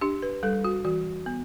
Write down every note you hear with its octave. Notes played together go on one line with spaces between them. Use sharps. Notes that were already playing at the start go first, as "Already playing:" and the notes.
D4 G4
B4
G3 A4
F#4
E3 F#4
B3